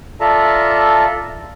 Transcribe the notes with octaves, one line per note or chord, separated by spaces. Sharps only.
F4 A4 D5 E5 A5 A#5